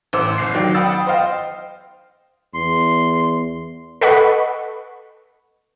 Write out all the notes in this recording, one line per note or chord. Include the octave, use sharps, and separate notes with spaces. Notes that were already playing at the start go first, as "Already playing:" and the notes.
A1 C5 D6 E6
F#1 C7
D#3 F#3 D5 G5
F#5 G5 B5 D#6 E6 A6
C5 D#5 F5 G5
E2 C6
A4 B4 D#5 F#5 B5 C#6